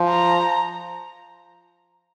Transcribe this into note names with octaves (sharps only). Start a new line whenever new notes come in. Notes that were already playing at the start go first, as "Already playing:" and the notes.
Already playing: F3
A#5